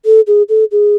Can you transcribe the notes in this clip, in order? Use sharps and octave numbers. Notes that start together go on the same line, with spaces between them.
A4
G#4
A4
G#4